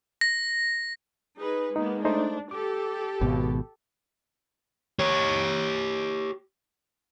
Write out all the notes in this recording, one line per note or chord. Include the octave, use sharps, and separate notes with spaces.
A#6
D#4 G#4 B4
G#3 A#3 B3 D#4
A3 D4 D#4 C5
G4 A4 D6
G#1 B2
G4 C#5